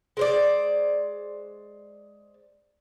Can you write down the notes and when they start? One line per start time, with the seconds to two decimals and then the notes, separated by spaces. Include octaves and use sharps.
0.17 G#3 C5 D5